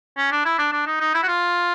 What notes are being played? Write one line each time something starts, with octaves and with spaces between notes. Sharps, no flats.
C#4
D4
E4
D4
D4
D#4
D#4
E4
F#4
F4